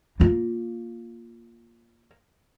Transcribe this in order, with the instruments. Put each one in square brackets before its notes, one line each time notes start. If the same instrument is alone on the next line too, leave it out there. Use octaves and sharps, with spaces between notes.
[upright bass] A#3 F4